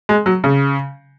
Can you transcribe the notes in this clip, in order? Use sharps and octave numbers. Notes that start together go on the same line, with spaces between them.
G#3
F#3
C#3